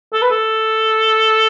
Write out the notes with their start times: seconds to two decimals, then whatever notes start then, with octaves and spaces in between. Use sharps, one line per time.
0.13 A4
0.22 B4
0.31 A4